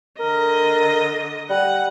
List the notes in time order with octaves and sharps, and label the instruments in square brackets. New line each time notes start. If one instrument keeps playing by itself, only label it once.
[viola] D3 D#5 [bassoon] A#4
[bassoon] G3 [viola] F#5